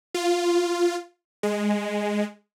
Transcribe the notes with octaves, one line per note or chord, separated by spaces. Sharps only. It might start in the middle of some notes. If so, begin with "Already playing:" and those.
F4
G#3